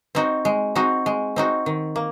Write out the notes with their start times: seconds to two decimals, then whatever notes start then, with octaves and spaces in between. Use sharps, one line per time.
0.15 C4 D#4 F#4
0.45 G#3
0.75 C4 D#4 F#4
1.06 G#3
1.36 C4 D#4 F#4
1.66 D#3
1.96 A#3